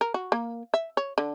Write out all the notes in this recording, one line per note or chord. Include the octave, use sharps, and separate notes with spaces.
A#4
F#4
A#3
E5
C#5
D3